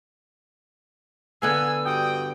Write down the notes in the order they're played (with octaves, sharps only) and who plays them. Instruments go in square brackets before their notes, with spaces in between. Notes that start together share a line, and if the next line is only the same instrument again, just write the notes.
[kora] D3 B3 F5 [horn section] G#5 [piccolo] E6
[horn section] G2 F#4 G5 [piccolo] D#6